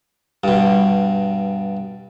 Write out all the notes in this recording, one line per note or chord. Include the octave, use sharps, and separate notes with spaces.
G2 B2